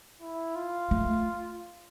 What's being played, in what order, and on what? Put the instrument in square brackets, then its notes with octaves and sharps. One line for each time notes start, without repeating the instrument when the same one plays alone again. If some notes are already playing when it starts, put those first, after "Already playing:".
[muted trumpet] E4
F4
[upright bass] A3